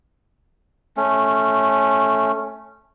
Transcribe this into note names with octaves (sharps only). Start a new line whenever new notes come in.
A3 C#4